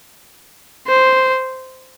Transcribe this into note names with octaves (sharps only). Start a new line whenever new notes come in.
C5